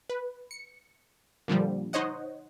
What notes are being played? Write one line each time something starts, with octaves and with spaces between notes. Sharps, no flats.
B4
C#7
A#2 D3 F3 G3
D#4 C5 C#5 D#5 F#5